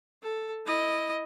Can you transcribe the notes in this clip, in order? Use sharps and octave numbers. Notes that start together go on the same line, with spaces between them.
A4
E4 D#5